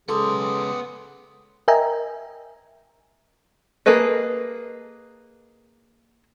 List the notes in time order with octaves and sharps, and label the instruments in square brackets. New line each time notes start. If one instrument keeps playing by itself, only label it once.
[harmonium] C#3 G#3 [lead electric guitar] B3 C6 [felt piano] A4 [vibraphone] D6 D#6
[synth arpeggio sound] A#4 D#5 E5 G5 G#5 A#5
[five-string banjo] A#3 G#4 A4 B4 D#5